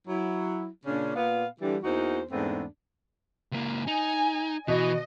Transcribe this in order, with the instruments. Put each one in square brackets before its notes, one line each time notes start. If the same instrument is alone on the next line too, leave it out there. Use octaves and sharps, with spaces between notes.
[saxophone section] F#3 E4
A#2 C#3 C#4 D4
A#2 B3 F5
D3 E3 G3
E2 E3 A#3 D#4 F#4 C5
E2 G#2 A3 B3 C4 D4
[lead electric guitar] C#2 A#3
[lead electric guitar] D#4 [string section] G#5
[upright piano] B2 [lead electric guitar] E3 [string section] D#5